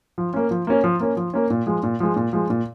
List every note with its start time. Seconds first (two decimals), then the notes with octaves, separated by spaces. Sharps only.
0.18 F3
0.34 A#3 C#4
0.51 F3
0.67 A#3 C#4
0.84 F3
1.00 A#3 C#4
1.17 F3
1.34 A#3 C#4
1.50 A#2
1.67 F3 G#3
1.83 A#2
2.00 F3 G#3
2.16 A#2
2.33 F3 G#3
2.50 A#2